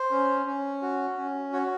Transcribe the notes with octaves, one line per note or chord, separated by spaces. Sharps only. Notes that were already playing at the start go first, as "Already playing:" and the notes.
Already playing: C5
C#4
C#4
F#4
C#4
F#4 C#5